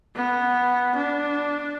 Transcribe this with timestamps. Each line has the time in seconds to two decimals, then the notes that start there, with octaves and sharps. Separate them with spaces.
0.16 B3
0.96 D4